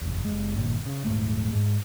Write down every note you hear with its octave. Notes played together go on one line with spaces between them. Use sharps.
F#1 E2
F#1 G#3
G1 A#2 D#3
C#3
D#1 G#2 A3
G#2